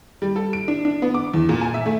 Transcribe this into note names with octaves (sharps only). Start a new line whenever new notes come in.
G3
A4
D7
D4
D4
B3
D6
E2
A#2
G#5
E5
A3